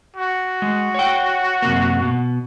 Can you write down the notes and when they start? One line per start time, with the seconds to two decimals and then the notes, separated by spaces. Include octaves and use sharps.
0.16 F#4
0.62 G#3
0.95 C#5 G5
1.62 F#2 C3 A#3
2.02 B2